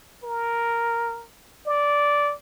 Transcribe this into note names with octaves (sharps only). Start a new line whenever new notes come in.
A#4
D5